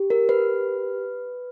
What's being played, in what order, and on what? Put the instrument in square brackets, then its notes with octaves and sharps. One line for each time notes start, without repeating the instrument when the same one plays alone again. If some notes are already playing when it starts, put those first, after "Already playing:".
Already playing: [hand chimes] G4
A#4
B4